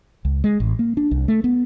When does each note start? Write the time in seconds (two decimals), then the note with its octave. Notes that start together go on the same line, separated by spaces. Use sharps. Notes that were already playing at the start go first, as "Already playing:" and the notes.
0.25 C#2
0.44 G#3
0.60 A1
0.79 A#3
0.97 D4
1.11 C2
1.28 A3
1.44 B3